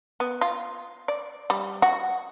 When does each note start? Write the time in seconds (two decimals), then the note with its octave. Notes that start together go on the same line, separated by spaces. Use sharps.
0.20 B3
0.41 F4
1.08 D5
1.50 G3
1.82 F#4